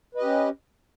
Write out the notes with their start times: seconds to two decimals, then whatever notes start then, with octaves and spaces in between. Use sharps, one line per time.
0.15 B4
0.17 D#5
0.20 G4
0.23 C#4